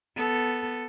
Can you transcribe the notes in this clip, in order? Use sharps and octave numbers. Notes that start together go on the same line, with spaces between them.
B3 A4